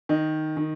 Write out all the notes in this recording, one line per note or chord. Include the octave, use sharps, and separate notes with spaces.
D#3 D#5
D#3